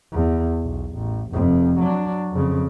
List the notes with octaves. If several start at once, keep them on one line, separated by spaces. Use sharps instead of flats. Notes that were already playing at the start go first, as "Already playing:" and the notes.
E2
B1
A1
F1 F2
F#3 D4
F2 C#3